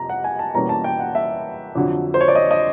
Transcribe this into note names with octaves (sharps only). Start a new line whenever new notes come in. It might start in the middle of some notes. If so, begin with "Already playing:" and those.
Already playing: F2 C3 A#5
F#5
G#5
A5
E2 B2 G3 A#3 C#4 A#5
A5
G5
F#5
E5
F2 D3 F#3
C5
C#5
D5
D#5
D#5